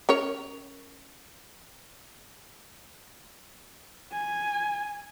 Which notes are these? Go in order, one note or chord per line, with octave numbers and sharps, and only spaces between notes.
C#4 A#4 C#5
G#5